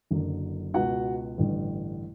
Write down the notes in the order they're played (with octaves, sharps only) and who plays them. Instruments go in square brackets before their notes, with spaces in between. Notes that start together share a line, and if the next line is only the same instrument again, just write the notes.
[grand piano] F#1 F#2 D3
C#2 B2 F#4 F#5
A1 G2 D3